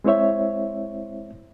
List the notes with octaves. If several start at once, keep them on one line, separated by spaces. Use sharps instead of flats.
G#3 C4 E4 C5 C#5 E5